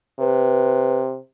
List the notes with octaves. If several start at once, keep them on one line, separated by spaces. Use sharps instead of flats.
C3 B4